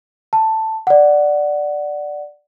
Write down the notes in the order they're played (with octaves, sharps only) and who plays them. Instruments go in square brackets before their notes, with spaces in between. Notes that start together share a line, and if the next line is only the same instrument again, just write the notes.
[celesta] A5
D5 F#5